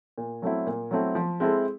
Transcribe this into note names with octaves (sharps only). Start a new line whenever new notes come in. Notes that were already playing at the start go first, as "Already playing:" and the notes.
A#2
F#3 A3 C4 E4
A#2
F#3 A3 C4 E4
F3
G#3 C4 E4 A4